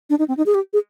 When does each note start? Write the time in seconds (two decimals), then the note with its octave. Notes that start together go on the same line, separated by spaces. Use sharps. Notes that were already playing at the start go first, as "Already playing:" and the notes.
0.10 D4
0.19 D#4
0.28 C4
0.37 D#4
0.46 G#4
0.55 G4
0.73 G#4